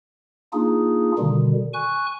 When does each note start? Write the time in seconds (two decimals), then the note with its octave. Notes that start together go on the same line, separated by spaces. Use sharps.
0.53 A#3 D4 D#4 F4 G#4
1.18 B2 D3 D#3 G3
1.73 G#5 C#6 F#6